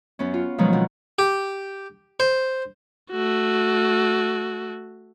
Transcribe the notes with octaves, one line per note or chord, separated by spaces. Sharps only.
F#2 B3 C#4
F4
B2 D#3 F3 F#3 G#3 B3
B2 G#3 C4
G4
C5
A3 F#4